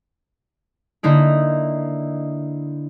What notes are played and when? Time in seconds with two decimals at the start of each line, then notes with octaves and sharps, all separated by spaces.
1.03 D3 A#3 D#4 E4